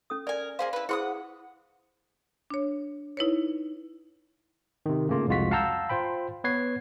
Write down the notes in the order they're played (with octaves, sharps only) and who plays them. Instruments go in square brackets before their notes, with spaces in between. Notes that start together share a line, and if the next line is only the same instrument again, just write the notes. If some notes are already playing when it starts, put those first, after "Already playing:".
[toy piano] C#4 A4 D#6
[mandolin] A#4 G#5 [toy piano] D5
[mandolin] A#3 G#4 C5 [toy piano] F5
[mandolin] E4 B4
[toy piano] E4 G#4 C5 [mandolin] F#5 C6 D#6
[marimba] D4 C#5
D#4 E4 B4 C#5
[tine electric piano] C3 D#3
C#3 A3 A#3 F4
C2 F2 G#3 F4 F#4 B6
F5 F#5 A5 A#5 E6 G6
F4 C5 G5 B5
B3 B4 C#5 G#6 C7